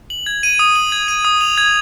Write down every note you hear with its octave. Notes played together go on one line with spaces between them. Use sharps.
F#7
G#6
D#7
D#6
F#7
G#6
D#7
D#6
F7
G#6